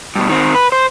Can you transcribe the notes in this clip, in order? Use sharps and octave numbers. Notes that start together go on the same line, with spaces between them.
G2 B2
D#3 C4
B4
C5